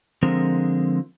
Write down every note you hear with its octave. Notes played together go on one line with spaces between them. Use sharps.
D3 F3 G#3 C4 A#4